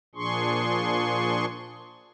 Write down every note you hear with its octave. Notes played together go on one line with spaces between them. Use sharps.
A#2 F3 D4 G#4 C6 C#6